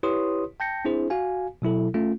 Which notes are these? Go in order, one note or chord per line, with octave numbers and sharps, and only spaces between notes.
E4 G4 B4 C#5 C6 D#6
G5 A5 G6 A#6 C#7
C4 D4 E4 G#4 C5
F#4 F5 G#5
B2 F#3 E4 A4
A3 C#4 F4